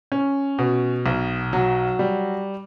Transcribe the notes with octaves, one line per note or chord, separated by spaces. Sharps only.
C#4
B2
B1
F#3
G3